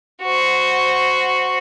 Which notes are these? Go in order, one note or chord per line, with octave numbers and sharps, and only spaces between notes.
F#4 C5